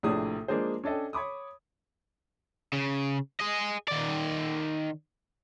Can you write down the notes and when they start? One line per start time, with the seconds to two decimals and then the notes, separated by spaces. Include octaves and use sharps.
0.03 A#1 A2 C3 D4 G#4 D#6
0.48 F3 G#3 A#3 D4 G#4 C5
0.84 C#4 D4 A4 D#5 G5
1.13 C#5 B5 D6 D#6
2.73 C#3
3.40 G#4 D#5
3.88 D#3 D5